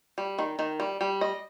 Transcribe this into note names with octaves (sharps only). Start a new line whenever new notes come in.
G3
D#3
D#3
G3
G3
D#5